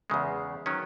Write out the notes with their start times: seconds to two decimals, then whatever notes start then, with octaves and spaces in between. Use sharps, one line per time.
0.10 E2 C#3 G#3
0.66 D#3 F#3 C#4